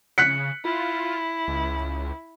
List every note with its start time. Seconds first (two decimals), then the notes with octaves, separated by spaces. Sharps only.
0.18 C#3 F#6 B6 C#7
0.65 E4 F4
1.48 C#2